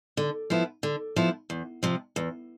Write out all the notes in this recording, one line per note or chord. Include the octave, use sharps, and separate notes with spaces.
D3
F3 B3 E4
D3
F3 B3 E4
E2
C3 F3
E2